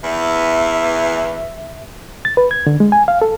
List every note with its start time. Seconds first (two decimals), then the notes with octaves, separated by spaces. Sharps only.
0.03 E2 E3 E5
2.25 A6
2.37 B4
2.51 G#6
2.67 D3
2.80 G#3
2.92 G#5
3.08 F5
3.22 A4